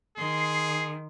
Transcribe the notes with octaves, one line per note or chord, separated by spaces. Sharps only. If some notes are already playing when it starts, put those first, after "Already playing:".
D#3 G#4 C6 C7